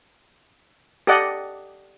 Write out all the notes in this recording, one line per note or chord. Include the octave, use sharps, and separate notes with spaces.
G4 A4 D5 D#5 F#5